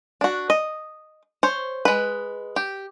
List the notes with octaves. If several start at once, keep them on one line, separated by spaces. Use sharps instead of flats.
D4 F#4
D#5
C5 C#5
G#3 B4
G4